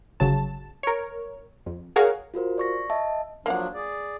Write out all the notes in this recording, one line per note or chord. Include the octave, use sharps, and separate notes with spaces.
G1 C#3 F#3 A5
A#4 C#5
F2
F#4 G#4 A#4 C#5 F5
F4 F#4 A#4 C5
D5 C#6 A#6
D#5 E5 A5
F3 F#3 A#3 D4 F5 F#5
G#4 D5